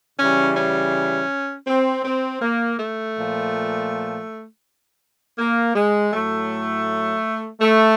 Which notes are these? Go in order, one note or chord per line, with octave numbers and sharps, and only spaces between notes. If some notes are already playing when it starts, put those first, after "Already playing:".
C#3 E3 G3 C#4
C#4
C4
C4
A#3
A3
A#2 F3
A#3
G#3
A2 F#3 A3
A3